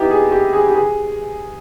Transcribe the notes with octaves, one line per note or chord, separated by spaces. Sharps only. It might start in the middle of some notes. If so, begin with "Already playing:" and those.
Already playing: B3 D#4 E4 G4
G#4
G4
G#4
G4
G#4